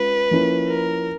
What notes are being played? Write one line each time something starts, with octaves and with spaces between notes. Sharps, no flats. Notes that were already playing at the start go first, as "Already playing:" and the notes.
Already playing: G#3 C#4 F4 B4
F3 A#3 C#4 E4
A#4